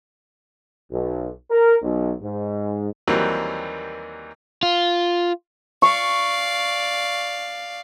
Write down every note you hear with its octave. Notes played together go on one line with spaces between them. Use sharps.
B1
A#4
B1
G#2
D#2 E3 F#3 G3 A#3 C4
F4
D5 F5 C#6